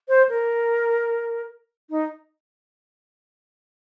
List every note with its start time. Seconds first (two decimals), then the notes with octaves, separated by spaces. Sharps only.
0.09 C5
0.29 A#4
1.90 D#4